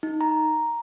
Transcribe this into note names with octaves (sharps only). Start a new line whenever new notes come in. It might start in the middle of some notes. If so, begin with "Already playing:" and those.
D#4
A#5